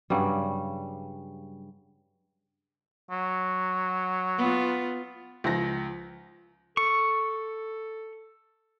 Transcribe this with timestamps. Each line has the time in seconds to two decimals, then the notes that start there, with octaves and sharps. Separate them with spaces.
0.10 G2 C#3 F#3 G3
3.11 F#3
4.38 B3 F4
5.44 C#2 F3 A#6
6.77 A4 C#6